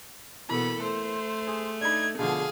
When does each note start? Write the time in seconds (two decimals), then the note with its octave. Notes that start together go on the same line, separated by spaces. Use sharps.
0.49 B2 E3 A#3 B3 A4 B5
0.83 A3 C5
1.47 G#4
1.81 D4 D#4 B5 G#6
2.19 B2 D3 F3 G#4 F5